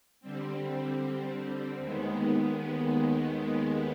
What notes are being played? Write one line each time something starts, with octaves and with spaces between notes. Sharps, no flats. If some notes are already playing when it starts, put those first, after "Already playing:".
D3 G3 C4
D#2 D#3 G#3 B3